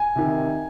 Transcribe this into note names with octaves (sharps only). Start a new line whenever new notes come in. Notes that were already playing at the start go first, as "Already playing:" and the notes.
Already playing: G#5
C3 D#3